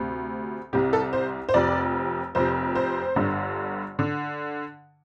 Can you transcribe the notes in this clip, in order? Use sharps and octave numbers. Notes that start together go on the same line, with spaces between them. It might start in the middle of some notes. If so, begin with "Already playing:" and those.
Already playing: D2 C3
C2 C3 G4
A4
C5
C5
F1 F2 C3 D5
F1 F2 C3 C5
C5
G1 G2 D3
D3